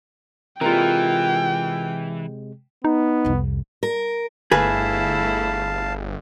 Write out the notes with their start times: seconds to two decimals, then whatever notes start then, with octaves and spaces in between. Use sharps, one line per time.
0.61 C3 E3 G#3 F4 A#4 G5
2.84 B3 D#4
3.25 C2 F2
3.83 A#4
4.52 G1 A3 E4 G#4 B4 F5 A5